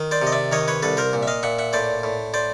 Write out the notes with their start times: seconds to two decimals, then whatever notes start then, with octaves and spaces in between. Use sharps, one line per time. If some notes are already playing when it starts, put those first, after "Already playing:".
Already playing: D#3
0.11 C5 D5
0.22 C3
0.27 D#5
0.32 D5 E5
0.52 D#3 C#5 D#5
0.68 B4 C#5
0.83 C2 A4 B4
0.97 A#4 C5
1.13 A#2
1.23 E5
1.27 D#5 F5
1.43 A#2 E5 F#5
1.59 E5 F#5
1.73 A2 C5 D5
2.03 A2
2.34 C5 D5